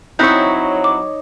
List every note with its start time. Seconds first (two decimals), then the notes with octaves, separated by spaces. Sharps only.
0.19 F#3 C4 D#4 E4 C#5 E5 F#6 G6
0.84 D6